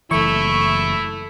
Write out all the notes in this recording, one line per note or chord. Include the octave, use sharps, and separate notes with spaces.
F#1 E3 A3 E4 C#6